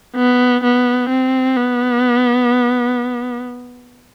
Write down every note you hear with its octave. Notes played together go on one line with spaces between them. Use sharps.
B3
B3
C4
B3